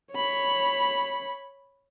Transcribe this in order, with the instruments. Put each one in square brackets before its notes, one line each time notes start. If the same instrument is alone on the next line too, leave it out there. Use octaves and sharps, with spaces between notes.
[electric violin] C#5 B5